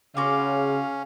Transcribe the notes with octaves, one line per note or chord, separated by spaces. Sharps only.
C#3 C#4 F#4 F5 C6 D6